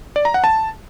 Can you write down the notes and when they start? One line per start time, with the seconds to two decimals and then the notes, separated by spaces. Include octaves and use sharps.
0.16 D5
0.25 A#5
0.34 F#5
0.44 A5